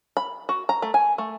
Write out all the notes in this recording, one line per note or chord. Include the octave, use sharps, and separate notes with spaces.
B5
F#4
A#5
A3
G#5
A3